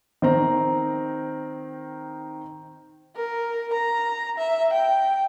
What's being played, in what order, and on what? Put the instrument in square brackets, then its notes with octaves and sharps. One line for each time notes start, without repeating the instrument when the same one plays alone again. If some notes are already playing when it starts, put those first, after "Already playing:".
[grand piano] D#3 C4 A#5
[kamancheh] A#4
A#5
E5
G5